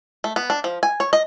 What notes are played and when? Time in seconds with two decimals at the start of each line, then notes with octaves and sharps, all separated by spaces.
0.24 A3
0.36 B3
0.50 D4
0.64 F3
0.83 G#5
1.00 C#5
1.13 D#5